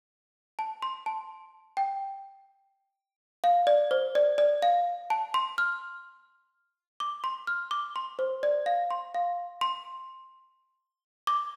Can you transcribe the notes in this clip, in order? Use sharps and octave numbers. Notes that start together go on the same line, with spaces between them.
A5
C6
A5
G5
F5
D5
C5
D5
D5
F5
A5
C6
F6
D6
C6
F6
D6
C6
C5
D5
F5
C6
F5
C6
D6